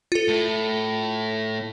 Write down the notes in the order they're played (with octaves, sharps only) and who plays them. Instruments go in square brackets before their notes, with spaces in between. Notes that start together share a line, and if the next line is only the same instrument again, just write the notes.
[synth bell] F4 A4
[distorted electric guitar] A2